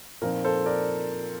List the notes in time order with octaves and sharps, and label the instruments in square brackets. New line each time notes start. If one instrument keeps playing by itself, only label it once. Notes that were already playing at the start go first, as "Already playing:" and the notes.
[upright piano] A#2 F3 C4 D#4 A#4
A4 C5
A#4 D5